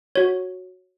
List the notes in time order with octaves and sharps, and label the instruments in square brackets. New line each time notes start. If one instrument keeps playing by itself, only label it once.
[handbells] F#4 C#5